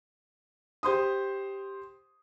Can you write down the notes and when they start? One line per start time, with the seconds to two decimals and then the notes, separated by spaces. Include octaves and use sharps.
0.83 G4 C5 C6 D#6